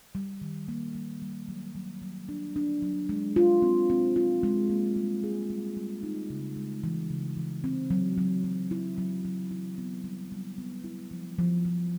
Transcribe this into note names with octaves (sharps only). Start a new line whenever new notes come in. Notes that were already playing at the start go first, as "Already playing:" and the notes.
G3
D#3
A#3
G3
G3
F#3
F#3
F#3
D4
D4
F#3
G#3
F4
C4
C4
F4
G#3
A#3
G3
G#4
G3
G3
D#4
C#3
G#3
E3
C#3
E3
C4
F#3
F#3
F#3
E4
F#3
F#3
E4
B3
G3
G3
B3
E4
F3
F3
F3